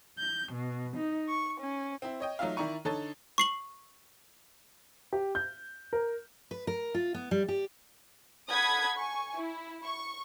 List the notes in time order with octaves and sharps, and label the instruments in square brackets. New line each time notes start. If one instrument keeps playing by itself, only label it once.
[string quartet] G6
B2
D#4
C#6
C#4
[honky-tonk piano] C4 E4
C#5 D#5 G5
F#3 A3 D#4 F4 E5 F5
D#3 E4 D5 A#5 C#6 D#7
D3 D#4 A4 C#5 A5 A6
[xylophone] C#6 C7 F#7
[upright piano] G4
G6
A#4
[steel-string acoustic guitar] B4
A#4
F4
B3
G3
G4
[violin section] A4 F#5 B5 D#6 G#6
G#5 C#6
E4
C#6